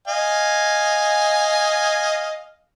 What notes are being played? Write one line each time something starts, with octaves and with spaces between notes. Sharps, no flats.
D#5 F5 G#5